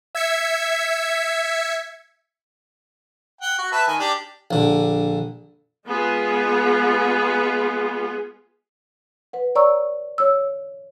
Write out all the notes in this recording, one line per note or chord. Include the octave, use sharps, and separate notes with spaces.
E5 G#6 B6 C#7
F#5 G5
F#4
B4 E5 A5
D#3 G#5
D4 G4
A#1 D3
G#3 B3 F4 G#4
B4 F#5
C#5 D5 A#5 C#6 E6
C#5 E6